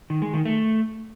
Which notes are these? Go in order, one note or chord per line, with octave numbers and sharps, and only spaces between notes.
D#3
G#3
D#3
A3